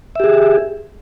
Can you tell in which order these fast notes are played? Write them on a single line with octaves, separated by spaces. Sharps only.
E5 G4 G#4